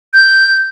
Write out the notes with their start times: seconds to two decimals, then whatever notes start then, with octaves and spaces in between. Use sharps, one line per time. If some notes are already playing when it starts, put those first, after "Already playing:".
0.13 G6